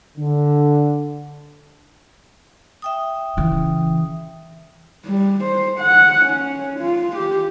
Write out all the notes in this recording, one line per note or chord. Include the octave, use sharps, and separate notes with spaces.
D3
E5 G5 D#6
C#3 E3
G3
C5
F#5
C#4
F4
G4